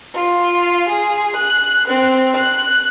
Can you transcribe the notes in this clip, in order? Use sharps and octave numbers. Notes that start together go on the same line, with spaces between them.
F4
G#4
F#6
C4
F#6